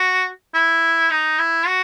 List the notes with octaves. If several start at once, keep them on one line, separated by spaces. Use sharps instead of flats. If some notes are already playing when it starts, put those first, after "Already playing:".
Already playing: F#4
E4
D#4
E4
F#4